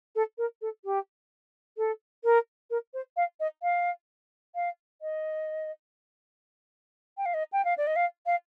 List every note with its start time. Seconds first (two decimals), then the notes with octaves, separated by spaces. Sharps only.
0.15 A4
0.38 A#4
0.62 A4
0.85 G4
1.78 A4
2.24 A#4
2.70 A#4
2.94 C5
3.17 F5
3.40 D#5
3.63 F5
4.55 F5
5.02 D#5
7.17 G5
7.26 F5
7.34 D#5
7.53 G5
7.65 F5
7.78 D5
7.87 D#5
7.96 F5
8.26 F5